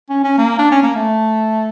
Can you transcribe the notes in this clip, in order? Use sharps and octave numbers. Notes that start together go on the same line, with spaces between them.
C#4
C#4
A#3
D4
C#4
A#3
A3